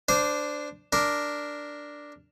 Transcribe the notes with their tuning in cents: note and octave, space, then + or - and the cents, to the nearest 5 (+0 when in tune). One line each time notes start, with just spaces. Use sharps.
D4 +0 C5 -20
D4 +0 A#4 +0